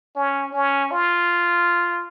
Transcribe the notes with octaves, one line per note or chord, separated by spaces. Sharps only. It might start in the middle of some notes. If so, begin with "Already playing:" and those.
C#4
C#4
F4